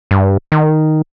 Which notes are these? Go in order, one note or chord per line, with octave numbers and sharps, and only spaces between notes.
G2
D#3